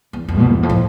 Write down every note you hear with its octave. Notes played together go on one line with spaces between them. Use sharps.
E2
F2
B2
E2
F2
A2